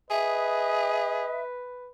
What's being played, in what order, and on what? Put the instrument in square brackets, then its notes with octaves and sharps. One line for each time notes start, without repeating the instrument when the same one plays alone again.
[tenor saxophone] G#4 [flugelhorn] B4 [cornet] D#5 [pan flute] E5